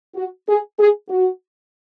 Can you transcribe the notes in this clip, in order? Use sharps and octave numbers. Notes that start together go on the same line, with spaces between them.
F#4
G#4
G#4
F#4